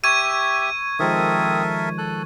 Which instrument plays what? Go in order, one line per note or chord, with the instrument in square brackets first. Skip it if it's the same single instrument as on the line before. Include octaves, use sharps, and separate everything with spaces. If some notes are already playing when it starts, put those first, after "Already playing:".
[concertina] G4 E5 [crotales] C#6 G#6 D#7 [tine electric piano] E6
[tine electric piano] D#3 F3 G#3 [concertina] C4 D#6 [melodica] A4 A#4 E5
[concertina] A4 F#6